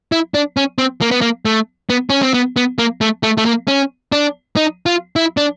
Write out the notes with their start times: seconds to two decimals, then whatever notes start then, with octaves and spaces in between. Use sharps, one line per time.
0.12 E4
0.34 D4
0.57 C#4
0.78 C4
1.01 A#3
1.11 B3
1.21 A#3
1.45 A3
1.90 B3
2.10 C#4
2.22 C4
2.34 B3
2.56 B3
2.79 A#3
3.01 A3
3.23 A3
3.38 A3
3.45 A#3
3.68 C#4
4.12 D4
4.56 D#4
4.86 F4
5.16 E4
5.37 D4